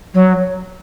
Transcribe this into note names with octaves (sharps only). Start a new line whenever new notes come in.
F#3